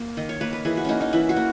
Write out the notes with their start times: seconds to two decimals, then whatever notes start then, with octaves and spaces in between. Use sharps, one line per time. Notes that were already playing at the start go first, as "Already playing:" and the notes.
Already playing: A#3
0.17 D#3 D#5
0.29 C#5
0.41 A#3 B4
0.53 B4
0.65 E3 G#4
0.77 F#4
0.85 A#3 C#4 D#4
1.01 D#4
1.13 E3 E4
1.29 F#4
1.36 A#3